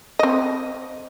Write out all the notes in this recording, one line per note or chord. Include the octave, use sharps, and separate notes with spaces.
C4 D#5